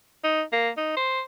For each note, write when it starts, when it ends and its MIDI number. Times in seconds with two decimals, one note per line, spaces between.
0.24 0.42 63
0.53 0.69 58
0.77 0.96 63
0.97 1.22 72